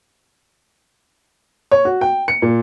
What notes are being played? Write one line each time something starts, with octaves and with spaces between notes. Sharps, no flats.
C#5
F#4
G5
C#7
A#2